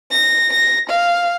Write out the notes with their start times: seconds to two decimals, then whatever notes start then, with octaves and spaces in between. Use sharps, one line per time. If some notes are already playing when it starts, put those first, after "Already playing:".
0.11 A#6
0.53 A#6
0.90 F5